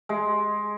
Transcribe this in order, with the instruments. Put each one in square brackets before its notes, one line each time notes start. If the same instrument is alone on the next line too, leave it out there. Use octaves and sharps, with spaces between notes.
[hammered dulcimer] G#3